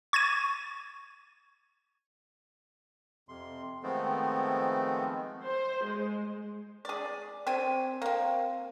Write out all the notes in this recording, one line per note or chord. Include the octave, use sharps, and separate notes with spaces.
C#6 G#6 A6 D#7
F2 C3 C6
D#3 F3 G#3 A3 B3 C4
C5
G#3
G#4 D5
C4 G#5
A#3 C4